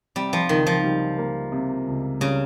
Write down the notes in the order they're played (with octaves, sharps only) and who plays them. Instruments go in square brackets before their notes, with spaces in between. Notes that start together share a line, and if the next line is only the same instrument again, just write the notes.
[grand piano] C3 [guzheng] G3
[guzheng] F3
[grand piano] C#2 [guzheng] D#3
[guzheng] F3
[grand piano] G3
A#3
C3
C#2
[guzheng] C#3 [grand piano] G3